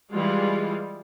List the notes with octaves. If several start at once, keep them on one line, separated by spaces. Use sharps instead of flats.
E3 G3 G#3 F4